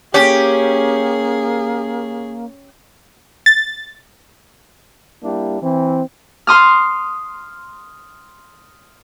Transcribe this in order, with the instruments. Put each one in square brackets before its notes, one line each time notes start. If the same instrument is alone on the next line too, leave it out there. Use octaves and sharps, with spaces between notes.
[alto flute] A#3 [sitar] C#4 [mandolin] G4 [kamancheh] G#4
[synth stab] A6
[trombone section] G3 A#3 D4 E4 G4
E3 C4
[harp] C6 D#6 F6